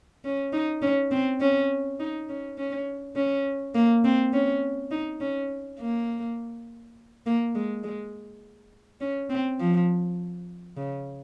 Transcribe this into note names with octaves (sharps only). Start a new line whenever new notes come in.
C#4
D#4
C#4
C4
C#4
D#4
C#4
C#4
C#4
A#3
C4
C#4
D#4
C#4
A#3
A#3
G#3
G#3
C#4
C4
F3
C#3